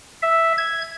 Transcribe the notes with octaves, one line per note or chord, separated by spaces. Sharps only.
E5
G#6